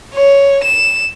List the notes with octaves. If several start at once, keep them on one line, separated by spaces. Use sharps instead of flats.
C#5
E7